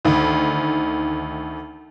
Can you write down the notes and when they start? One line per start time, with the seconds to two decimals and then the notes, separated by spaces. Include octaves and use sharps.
0.05 D2 D#3